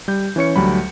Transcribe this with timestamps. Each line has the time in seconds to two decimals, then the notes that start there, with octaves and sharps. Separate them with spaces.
0.08 G3 G6
0.36 E3 C#4 C#5 C#7
0.56 D2 F#3 G3 B5